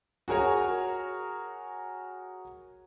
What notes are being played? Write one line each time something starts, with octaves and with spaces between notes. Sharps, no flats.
F#4 G#4 A#4 C#5 G#5